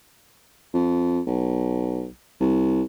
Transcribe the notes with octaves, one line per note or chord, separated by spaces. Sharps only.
F2
B1
C2